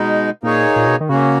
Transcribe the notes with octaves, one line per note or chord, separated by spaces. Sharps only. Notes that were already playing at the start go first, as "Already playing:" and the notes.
Already playing: B2 G#3 D#4
A#2 A#3 D#4 G#4 C#5
A#2
B2
D#3
C#3 A#3 C#4 F#4